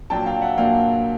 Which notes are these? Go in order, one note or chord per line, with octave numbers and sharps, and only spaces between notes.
A#2 F#3 A#3 D4 G5 A5
F5 G5
E5 F#5
A#2 F#3 A#3 D4 F5 G5